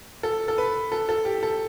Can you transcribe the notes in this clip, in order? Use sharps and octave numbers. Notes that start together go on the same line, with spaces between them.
A4
A4
B4
A4
A4
G4
A4